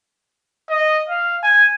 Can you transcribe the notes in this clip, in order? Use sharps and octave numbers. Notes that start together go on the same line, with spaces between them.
D#5
F5
G#5